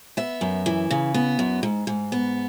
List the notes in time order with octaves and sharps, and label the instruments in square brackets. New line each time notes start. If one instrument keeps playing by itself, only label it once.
[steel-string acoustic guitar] B3 E5
F#2
E3
C#3
B3
F#2
G#2
G#2
B3